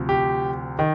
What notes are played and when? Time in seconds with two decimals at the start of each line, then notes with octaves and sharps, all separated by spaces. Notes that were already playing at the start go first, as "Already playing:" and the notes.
Already playing: D2 C3 F3
0.09 G4
0.79 D#3